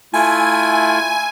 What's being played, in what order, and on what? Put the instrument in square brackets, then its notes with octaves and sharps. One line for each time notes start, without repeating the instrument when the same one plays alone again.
[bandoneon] A3 E4 F4 [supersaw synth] G#5